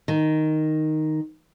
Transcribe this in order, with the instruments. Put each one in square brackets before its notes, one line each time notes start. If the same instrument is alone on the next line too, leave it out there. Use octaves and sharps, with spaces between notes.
[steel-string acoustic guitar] D#3